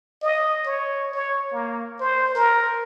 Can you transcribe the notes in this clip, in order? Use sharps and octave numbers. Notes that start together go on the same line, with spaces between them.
D#5
C#5
C#5
A#3
C5
A#4